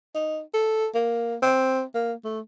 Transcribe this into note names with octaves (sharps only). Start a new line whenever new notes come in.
D#4
A4
A#3
C4
A#3
A3